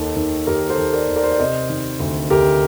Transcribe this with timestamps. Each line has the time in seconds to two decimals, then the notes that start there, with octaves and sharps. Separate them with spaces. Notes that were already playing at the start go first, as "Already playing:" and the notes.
Already playing: D#2 D#3 A4
0.16 D#3
0.47 D#2 G4 A#4
0.70 A4 C5
0.78 D#2
0.93 A#4 D5
1.08 D#2
1.16 A#4 D5
1.23 C5
1.31 D5
1.39 C3 C5 D#5
1.69 D#3
2.00 D2
2.30 D2 G4 A#4